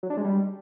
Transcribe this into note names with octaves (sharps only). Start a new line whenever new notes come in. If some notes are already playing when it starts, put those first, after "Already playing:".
F#3
D4
G#3
G3